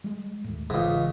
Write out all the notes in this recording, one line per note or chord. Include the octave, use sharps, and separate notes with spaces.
G3 G#3
D#2 A2
G1 C#2 G#2 C#3 E3